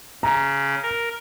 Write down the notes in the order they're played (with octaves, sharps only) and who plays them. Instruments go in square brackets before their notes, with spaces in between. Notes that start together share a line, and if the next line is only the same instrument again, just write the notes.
[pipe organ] C#3 [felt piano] A#5
[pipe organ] A#4